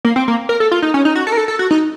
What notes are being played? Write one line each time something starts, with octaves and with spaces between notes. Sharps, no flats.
A#3
C4
A#3
A#4
A4
F4
D#4
C#4
D#4
F#4
A4
A#4
A4
A4
F#4
D#4